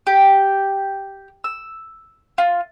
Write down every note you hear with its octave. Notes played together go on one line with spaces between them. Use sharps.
G4
E6
F4